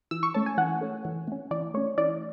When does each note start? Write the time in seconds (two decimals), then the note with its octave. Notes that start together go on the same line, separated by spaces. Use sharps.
0.11 E3 E6
0.23 C#6
0.34 A3 C#4 A5
0.46 G#5
0.58 E3 F#5
0.81 A3 C#4
1.05 E3
1.28 A3 C#4
1.51 E3 D5
1.74 A3 C#4 C#5
1.98 E3 D5